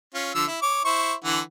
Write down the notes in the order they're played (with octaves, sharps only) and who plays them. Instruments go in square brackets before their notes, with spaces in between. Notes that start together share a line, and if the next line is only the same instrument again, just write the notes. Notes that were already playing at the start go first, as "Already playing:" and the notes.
[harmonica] C#4 F4
D3 F3 E6
E4
C#5 D6
E4 C5 C#6
D3 E3 F#5